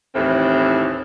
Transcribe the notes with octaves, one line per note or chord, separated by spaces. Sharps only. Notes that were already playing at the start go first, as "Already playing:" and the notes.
D#2 A2 E3 C4